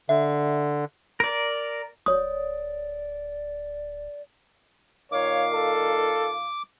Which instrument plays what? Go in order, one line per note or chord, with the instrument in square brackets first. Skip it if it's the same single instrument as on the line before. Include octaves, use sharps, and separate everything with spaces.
[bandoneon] D3 [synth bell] E5
[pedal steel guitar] A#4 D5
[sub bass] D1 [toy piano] C#5 D#6 [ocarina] D5
[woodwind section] A#2 D#3 F5 [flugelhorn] C#5 [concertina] D6
[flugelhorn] A4